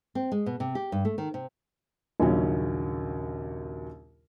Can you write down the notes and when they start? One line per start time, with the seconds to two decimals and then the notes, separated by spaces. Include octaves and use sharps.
0.15 C4
0.32 G#3
0.46 B2
0.60 C3
0.75 G4
0.92 G2
1.05 A3
1.18 D#3
1.34 C3
2.20 A#1 D#2 C#3 F#3 C#4